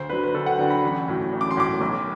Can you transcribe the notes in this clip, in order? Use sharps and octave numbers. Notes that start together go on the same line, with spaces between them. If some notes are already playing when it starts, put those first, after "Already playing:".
Already playing: D2 C5
D3 F#3 B4
B4
D2 A4
F#5
D3 F#3 G5
B5
A1
A2 F#3
A1
D6
C6
A2 F#3 D6
B1